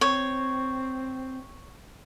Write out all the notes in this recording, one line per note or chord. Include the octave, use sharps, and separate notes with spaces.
C4 C#5